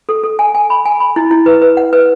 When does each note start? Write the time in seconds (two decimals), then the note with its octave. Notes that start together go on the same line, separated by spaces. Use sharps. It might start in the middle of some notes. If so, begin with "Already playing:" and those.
0.09 A4
0.23 A4
0.39 G#5
0.55 G#5
0.70 B5
0.86 G#5
1.00 B5
1.16 E4
1.31 E4
1.46 B4
1.62 B4
1.77 F#5
1.93 B4